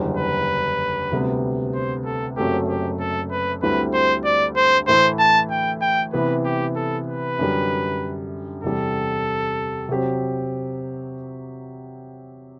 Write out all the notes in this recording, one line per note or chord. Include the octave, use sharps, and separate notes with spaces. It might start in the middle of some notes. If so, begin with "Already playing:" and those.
Already playing: F#1 E2 D3 G3
B4
D2 C3 G3 B3
C5
A4
F#1 F#2 F#3 A3 C4 G4
G4
A4
B4
D2 D3 G3 C4 E4 B4
C5
D5
C5
A2 E3 A3 E4 C5
A5
G5
G5
C3 E3 B3 B4
G4
A4
B4
F#2 D3 G3
E2 C3 G3 A4
C3 F#3 C4 G4 C5